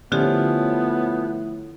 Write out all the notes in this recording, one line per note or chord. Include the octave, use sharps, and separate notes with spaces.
A2 D3 F3 B3 C#4 F4 G4